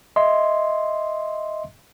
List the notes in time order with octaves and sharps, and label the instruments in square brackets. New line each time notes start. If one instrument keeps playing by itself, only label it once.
[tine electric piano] D#5 E5 C6